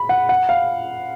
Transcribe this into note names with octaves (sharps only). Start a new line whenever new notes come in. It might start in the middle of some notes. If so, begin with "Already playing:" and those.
Already playing: B5
F#5
F#5
F5